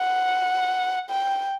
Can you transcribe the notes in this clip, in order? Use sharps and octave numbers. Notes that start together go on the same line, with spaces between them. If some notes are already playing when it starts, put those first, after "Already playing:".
Already playing: F#5
G5